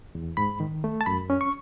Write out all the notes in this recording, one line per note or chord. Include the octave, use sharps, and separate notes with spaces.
E2
G#2 B5
D#3
A3
A5
F#2 B5
C#4
C#6